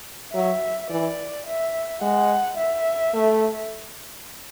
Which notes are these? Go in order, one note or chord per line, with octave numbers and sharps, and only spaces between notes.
F#3 E5
E3 D5
E5
G#3 F#5
E5
A3